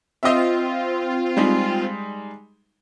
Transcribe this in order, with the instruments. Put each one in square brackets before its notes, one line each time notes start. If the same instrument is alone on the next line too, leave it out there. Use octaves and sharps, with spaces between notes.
[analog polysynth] C4 F4 [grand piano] D#5 E5
[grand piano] G3 G#3 D#4